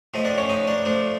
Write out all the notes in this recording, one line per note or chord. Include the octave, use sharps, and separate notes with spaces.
A2 F3 A3 D#5
D4 D5
C#4 C#5
D#4 D#5
D4 D5
F3 A3 D4